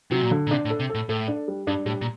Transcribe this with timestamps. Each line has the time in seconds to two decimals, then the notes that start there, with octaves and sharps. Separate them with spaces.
0.11 C3 F#3
0.21 A#2
0.31 D3
0.47 A#2
0.51 C3 D4
0.65 A2
0.70 A4
0.80 C3
0.89 A4
0.95 A2
1.09 A2 A4
1.28 D4
1.48 G3
1.67 G2 D4
1.86 A2 G3
2.01 A#2